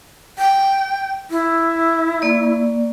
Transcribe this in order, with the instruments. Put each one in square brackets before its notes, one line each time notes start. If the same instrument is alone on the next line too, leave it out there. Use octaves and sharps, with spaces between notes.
[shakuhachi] G5
E4
[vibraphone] A#3 D5